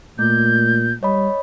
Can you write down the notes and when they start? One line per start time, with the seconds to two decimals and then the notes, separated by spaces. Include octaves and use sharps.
0.19 A#2 A3 G6
1.03 G3 C#5 D#5 B5